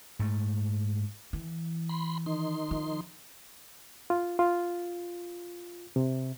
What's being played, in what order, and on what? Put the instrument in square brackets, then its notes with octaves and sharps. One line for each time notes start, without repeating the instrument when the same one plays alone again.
[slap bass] G#2 A3
[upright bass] E3
[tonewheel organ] B5 C6
D#3 D#4 C6
[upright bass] F3
[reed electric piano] F4
F4
C3